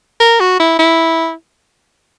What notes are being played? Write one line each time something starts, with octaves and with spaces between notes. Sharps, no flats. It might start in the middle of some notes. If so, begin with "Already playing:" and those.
A#4
F#4
E4
E4